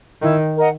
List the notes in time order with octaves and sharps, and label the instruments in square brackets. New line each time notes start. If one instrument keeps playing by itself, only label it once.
[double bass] D#3 [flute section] E4
[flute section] A#4 D#5 F#5